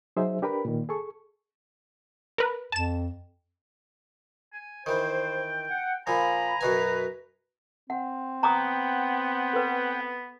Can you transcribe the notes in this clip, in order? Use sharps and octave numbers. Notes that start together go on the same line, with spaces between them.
F#3 D#4 G#4 C5 E5
D4 G4 A#4 B4 B5
A#2 D#3
G#4 A4 C#6
A#4 B4
F2 A5 E7
G#5
D#3 E3 C5 G5
F#5
A#2 F3 G#5 A#5 B5
F#2 B2 B4 G#5
C4 F#5
B3 F#5 G5 A#5 D6 D#6
A4 B4